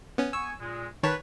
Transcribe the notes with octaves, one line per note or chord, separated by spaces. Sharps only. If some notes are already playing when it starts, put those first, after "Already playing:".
B3 C#4
B3 G#5 C#6 E6
A#2 G#3
D#3 B4 C#5 A5